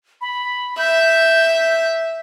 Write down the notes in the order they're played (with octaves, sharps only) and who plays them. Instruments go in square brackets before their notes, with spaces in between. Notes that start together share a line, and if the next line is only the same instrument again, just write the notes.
[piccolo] B5
[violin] E5 [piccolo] G6